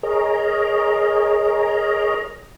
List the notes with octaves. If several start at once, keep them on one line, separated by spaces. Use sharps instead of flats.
G#4 A#4 C#5 D#5 A#5